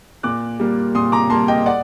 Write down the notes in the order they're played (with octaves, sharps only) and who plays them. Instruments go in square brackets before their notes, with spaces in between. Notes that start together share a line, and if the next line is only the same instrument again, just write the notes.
[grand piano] A#2 D6 F#6
G3 A#3
A#2 C6 D#6
A#5 D6
G3 A#3 A5 C6
D#5 G5
D5 F#5